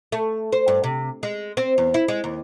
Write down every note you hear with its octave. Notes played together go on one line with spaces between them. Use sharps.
A3
C5
G2
C3
G#3
C4
E2
E4
G#3
D#2